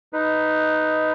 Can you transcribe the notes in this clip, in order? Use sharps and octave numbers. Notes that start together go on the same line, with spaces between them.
D#4 B4